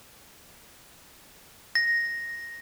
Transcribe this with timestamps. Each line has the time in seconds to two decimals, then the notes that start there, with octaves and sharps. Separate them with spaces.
1.75 A#6